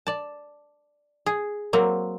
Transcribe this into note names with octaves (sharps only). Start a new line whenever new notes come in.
D5 A5
G#4
F#3 A#3 C4